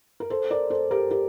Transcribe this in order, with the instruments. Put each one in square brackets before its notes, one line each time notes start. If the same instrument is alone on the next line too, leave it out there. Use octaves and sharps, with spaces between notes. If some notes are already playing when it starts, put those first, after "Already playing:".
[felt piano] A#4
A4 C5
A#4 D5
A4 C5
G4 A#4
G4 A#4